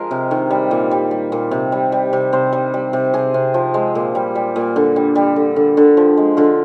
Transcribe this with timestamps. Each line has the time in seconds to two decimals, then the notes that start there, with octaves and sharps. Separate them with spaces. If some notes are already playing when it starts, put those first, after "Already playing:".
Already playing: F3 G#3 G#4 A#4
0.11 C3
0.31 D#3
0.51 G3
0.71 A#2
0.91 G3
1.11 G3
1.32 A#2
1.51 C3
1.72 G3
1.92 G3
2.13 C3
2.33 C3 C5
2.53 G3
2.74 G3
2.93 C3
3.14 C3 G#4
3.34 C3
3.54 F3
3.74 G#3
3.95 A#2
4.15 G3
4.35 G3
4.56 A#2
4.76 D3
4.96 G3
5.15 G3
5.36 D3
5.56 D3
5.77 D3
5.97 F3
6.17 G#3
6.37 D3 F4